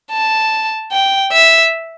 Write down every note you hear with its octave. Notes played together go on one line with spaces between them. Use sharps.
A5
G5
E5